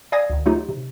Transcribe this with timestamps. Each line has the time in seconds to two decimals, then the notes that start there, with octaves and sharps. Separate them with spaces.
0.12 D5 F5 G#5 D#6 G#6 A#6
0.30 D2 D#3
0.46 F#3 A3 D#4 F4 G4
0.69 C3